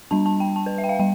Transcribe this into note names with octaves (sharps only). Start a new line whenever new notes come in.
G3 D4 A5
A5
G5
A5
B4
E5
G5
F5
G3 G5